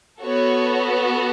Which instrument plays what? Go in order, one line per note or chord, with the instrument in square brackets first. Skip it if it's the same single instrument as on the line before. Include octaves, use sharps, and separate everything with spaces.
[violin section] B3 F#4 A4 C#5